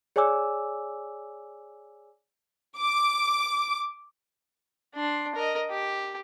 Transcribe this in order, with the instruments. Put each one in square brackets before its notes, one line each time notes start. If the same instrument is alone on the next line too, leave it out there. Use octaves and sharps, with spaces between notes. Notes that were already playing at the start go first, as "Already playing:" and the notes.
[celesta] G#4 C#5 D5 G#5 D6 E6
[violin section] D6
[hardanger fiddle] D4 C6
A#4 D#5
G4